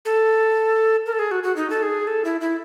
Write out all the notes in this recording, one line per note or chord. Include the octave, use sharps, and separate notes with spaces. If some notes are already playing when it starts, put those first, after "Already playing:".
A4
A#4
A4
G#4
F#4
F#4
D#4
A4
G#4
A4
E4
E4